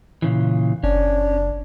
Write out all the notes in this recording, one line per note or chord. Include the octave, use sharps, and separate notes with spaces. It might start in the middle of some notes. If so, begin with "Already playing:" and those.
A#2 C#3 E3
F#1 C#4 D4